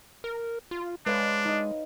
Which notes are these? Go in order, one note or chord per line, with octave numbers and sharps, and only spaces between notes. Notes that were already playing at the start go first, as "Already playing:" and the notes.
A#4
F4
G#3 D4 B4 C#5 F5
D#4 D#5